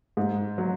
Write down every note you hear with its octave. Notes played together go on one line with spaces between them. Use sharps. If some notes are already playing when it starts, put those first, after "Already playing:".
G#2
F#3